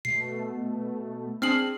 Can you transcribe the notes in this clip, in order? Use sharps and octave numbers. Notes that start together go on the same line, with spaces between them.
B2 A3 C7
C4 D4 G#4 F6 C7 F#7